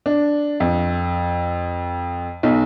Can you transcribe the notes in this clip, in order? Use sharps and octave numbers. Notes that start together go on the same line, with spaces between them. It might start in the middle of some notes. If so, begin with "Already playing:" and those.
D4
F2
B1